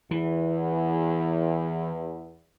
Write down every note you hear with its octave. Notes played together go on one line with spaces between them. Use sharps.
E2 E3